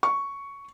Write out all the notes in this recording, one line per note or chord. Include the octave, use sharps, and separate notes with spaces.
C#6